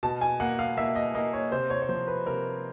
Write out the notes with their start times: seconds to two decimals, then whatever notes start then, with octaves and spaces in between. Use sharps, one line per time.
0.03 B2 A5
0.21 G#5
0.40 A#3 F#5
0.59 F5
0.77 A#3 E5
0.96 D#5
1.15 A#3 D#5
1.33 C#5
1.52 C3 C5
1.70 C#5
1.82 C#5
1.89 F3 C5
2.07 B4
2.26 C3 A#4